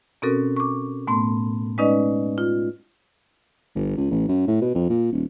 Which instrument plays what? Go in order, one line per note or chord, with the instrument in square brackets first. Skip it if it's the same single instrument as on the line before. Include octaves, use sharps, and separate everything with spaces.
[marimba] B2 C4 C#4 F#4 A4 A#4
C#6 D6
A2 A3 B3 C6
G#3 C#4 D#4 B4 D5 D#5
F4
[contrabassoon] G1
C#2
A1
F#2
A2
B2
F2
A#2
D#1